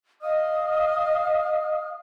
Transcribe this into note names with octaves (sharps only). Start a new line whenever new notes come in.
D#5 F5 D#6 F6